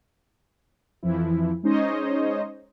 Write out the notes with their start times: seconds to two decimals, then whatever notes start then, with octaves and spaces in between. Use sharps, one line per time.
1.03 F2 E3 F3 E4
1.63 G#3 C#4 D#4 C5 C#5 D#5